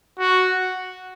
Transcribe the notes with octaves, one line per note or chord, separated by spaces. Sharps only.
F#4